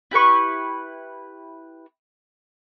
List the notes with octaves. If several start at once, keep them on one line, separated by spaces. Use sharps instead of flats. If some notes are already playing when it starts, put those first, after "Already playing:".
E4 G4 B4 C#6